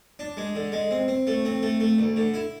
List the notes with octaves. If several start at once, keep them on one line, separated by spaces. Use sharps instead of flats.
D4
G#3
D3
G#3
C4
C4
A3
C4
A3
A3
D2
D3
E4